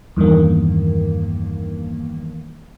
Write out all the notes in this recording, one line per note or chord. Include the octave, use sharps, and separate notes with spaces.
E2 G2 D#3 A#3